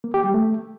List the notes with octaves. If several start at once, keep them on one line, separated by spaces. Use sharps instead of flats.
A#3
G4
G3
A3